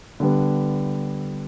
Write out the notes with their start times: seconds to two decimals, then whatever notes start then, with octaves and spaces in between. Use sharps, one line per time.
0.20 D3 G3 B3